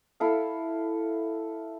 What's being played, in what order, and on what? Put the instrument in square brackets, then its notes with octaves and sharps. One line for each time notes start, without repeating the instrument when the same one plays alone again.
[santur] E4 A4 F5